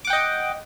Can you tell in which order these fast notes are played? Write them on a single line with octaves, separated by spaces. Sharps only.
D6 F#5 G5 D#5